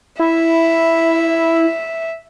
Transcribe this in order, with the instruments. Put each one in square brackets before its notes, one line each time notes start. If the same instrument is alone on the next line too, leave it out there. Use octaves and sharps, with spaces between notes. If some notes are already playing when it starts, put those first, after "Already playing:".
[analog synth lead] E4 [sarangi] E5